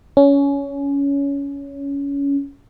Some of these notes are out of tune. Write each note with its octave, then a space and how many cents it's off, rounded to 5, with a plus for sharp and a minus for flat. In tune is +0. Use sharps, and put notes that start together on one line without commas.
C#4 +15